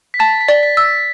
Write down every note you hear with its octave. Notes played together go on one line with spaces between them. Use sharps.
B6
A5 A6
B6
D5
B6
E6
B6